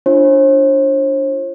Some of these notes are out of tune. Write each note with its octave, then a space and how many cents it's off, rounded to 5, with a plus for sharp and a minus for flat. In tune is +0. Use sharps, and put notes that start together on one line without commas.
D4 +0 F4 -25 C5 +45